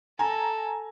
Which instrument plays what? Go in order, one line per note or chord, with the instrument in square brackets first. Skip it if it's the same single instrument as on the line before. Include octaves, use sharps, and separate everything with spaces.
[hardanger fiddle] A4 [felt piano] G#5 A#5